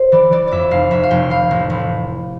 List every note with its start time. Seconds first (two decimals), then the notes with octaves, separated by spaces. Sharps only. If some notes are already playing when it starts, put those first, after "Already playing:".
Already playing: C5
0.12 E3 D5
0.32 E3 D5
0.47 F2 D5 E5
0.71 F1 F5
0.91 F1 E5
1.03 F5
1.10 F1 G5
1.30 E3 F5
1.51 A1
1.70 A1